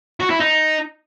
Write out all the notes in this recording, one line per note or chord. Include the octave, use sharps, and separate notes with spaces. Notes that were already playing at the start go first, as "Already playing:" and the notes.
F#4
E4
D#4